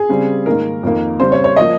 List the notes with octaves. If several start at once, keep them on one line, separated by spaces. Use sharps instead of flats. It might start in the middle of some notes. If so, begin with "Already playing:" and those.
Already playing: G#4
C#3 G3 C4
G#2 D#3 A#3 A#4
F2 D#3 A#3
C#3 G3 C4 C5
C#5
C#5
F3 A#3 D#5